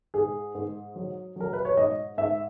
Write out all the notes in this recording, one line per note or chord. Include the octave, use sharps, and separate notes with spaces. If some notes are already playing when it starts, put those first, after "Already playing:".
G#2 G#4
G#2
F#3
F#3 A#4
B4
C#5
G#2 D#5
G#2 E5